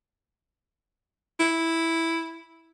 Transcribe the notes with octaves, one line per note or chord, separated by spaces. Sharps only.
E4